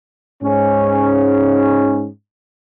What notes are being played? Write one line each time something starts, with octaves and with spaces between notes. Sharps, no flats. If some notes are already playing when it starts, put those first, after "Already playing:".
G#2 C#4